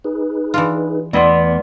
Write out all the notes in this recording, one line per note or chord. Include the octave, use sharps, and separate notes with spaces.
D#4 G#4 B4
E3 D4 F4
E2 E3 A3 B3 E4 D5 D#5 C6